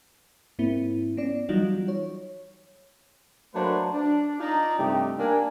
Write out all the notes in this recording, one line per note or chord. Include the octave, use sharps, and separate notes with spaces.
G#2 A#3 C4 E4
B3 C#4 D5
E3 F#3 G3 D#4 F4 F#4
C#5
F#3 A3 A#3 D4 B4 C5
D4
D4 D#4 F4 D5 D#5 A#5
G2 C3 A3 D#4 G4
A#3 D4 G#5